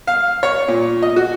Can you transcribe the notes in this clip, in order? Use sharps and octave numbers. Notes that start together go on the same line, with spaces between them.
F5
C#5
A#2
D#5
F#4